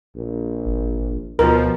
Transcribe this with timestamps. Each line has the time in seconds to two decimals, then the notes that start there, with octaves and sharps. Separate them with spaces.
0.16 A#1
0.65 G#1
1.39 D2 B2 F3 A#4